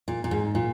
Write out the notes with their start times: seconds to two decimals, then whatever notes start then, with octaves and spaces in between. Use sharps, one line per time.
0.08 A#2
0.24 A#2
0.31 G#2
0.55 A#2